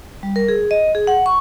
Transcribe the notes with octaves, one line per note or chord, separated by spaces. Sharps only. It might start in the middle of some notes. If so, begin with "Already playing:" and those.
G3
A#4
G#4
D#5
G#4
F#5
C#6